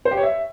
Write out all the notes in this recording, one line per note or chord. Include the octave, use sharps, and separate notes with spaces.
C5
G4
C#5
E5